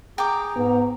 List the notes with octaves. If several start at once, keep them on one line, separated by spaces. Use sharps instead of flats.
G#4 G5 A#5 D6
G#2 B3